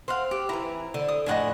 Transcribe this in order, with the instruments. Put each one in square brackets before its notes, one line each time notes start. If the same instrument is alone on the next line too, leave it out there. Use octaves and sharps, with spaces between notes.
[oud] C4 [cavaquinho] F5 F#5 C6
[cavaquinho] G4
[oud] E3 E4 [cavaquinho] A#5
[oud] D3
[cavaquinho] D#6
[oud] F2 A2 D4 [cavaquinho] D#5 F#5 G#5